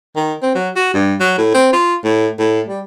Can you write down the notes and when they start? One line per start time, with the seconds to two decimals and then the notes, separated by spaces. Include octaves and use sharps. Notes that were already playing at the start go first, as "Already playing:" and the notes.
0.16 D#3
0.42 C4
0.55 F#3
0.76 F#4
0.94 G2
1.20 F#3
1.38 A2
1.54 C4
1.73 F4
2.04 A2
2.39 A2
2.68 G3